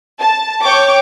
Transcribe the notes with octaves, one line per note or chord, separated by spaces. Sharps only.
A5
C#5 G5 C#6 D6